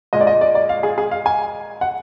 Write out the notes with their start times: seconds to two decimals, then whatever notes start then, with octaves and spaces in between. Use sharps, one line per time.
0.13 A#2 G#3 D#5
0.21 D5
0.27 D#5
0.41 D5
0.55 D5
0.69 F5
0.83 G#4
0.98 G#4
1.11 F5
1.26 G#5
1.81 F#5